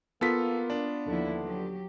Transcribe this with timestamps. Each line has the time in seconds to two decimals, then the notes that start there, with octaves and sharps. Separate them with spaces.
0.21 A#3 B3 F4 A4 B6
0.70 D4
1.07 D#2 D3 F3 E4
1.42 F#3 G4